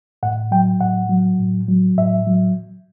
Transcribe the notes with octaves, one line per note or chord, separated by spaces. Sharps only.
A2 F#5
F#3 G5
A2 F#5
F#3
A2
F#3
A2 E5
F#3